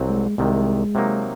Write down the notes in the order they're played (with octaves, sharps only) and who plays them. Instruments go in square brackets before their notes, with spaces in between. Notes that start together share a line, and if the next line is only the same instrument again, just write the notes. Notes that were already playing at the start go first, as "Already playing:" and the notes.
Already playing: [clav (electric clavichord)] C2 C3 F#3 C4
[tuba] G#3
[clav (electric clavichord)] C2 C3 D#3 [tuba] G#3
[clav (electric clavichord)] C3 F#3 A#3 D#4